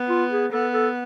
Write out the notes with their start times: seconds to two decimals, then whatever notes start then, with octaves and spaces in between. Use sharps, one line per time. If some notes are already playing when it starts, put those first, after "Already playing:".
Already playing: B3
0.09 F4
0.31 G#4
0.52 B3 A4
0.73 A4